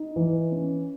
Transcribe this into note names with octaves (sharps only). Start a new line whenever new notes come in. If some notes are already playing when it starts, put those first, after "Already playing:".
Already playing: D#4
E3
C#4